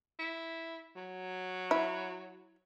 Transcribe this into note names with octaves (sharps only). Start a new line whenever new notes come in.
E4
F#3
E4